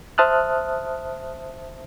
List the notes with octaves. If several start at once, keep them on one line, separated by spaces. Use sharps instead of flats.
C5 E5 A5 D#6 F6 F#6